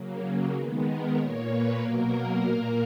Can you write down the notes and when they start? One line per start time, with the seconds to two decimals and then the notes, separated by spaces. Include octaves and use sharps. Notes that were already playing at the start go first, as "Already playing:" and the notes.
Already playing: C#3 F#3 A#3
0.53 D#3 G#3 B3
0.86 A#4
1.16 A#2 A#3 C#5
1.49 B4
1.79 B2 F#3 A#3 A#4
2.43 A#2 A#3